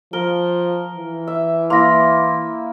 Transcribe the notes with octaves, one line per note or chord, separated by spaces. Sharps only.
F3 A#4 G7
E3
E5
A#3 E4 C6 A#6